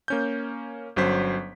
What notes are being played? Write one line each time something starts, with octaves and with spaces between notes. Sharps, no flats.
A#3 C#4 G6
G1 F#3 C#4 C5 B6